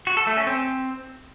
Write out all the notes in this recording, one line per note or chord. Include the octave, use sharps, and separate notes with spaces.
F#4
A4
A3
C#4
C4